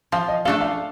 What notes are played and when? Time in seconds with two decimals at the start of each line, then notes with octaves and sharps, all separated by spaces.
0.12 F3 F5
0.28 D#5
0.45 A3 D4 A4 F5
0.61 F5